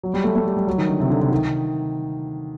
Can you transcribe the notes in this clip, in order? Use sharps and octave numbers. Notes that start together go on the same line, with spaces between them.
F#3
G3
A3
A3
G3
G3
F#3
D#3
D3
C3
D3
C3
D#3